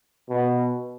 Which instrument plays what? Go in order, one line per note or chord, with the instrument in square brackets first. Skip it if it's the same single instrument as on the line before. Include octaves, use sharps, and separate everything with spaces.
[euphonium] B2